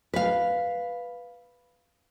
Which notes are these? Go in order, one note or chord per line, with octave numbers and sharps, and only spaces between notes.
B4 F5